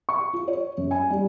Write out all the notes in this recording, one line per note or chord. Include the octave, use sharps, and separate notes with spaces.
C#6
F4
C#5
F#2
G#5
G3